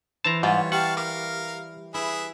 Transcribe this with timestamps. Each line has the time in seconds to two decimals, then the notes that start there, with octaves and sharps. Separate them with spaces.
0.24 E3 E4 C5 A5 A#5
0.43 G#2 G3 F4 C#5 F5 F#5
0.72 G4 F5 F#5 A5 C#6
0.97 A#4 F5 D6
1.94 E4 G#4 B4 E5